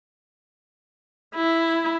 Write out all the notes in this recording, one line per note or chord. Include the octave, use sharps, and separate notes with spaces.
E4